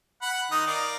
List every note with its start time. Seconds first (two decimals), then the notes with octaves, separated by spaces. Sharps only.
0.22 F#5 B5
0.51 D#3 D#4 D#6
0.67 A#4 D5 F5